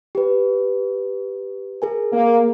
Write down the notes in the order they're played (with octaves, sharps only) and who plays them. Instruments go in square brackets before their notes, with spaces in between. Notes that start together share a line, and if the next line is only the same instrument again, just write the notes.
[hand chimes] G4 B4
G#4 A#4 G#5
[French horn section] A#3